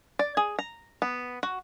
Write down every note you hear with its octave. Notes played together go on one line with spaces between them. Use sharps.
D5
G#4
A#5
B3
F#4